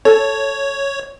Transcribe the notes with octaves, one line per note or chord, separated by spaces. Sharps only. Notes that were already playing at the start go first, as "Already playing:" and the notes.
A4 C#5